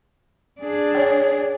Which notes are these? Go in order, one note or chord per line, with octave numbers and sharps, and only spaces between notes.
D4 G#4
C#5 G5